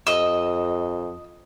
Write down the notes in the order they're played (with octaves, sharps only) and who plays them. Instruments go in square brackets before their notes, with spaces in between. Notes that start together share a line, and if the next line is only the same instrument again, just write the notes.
[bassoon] F2 [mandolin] D#5 E6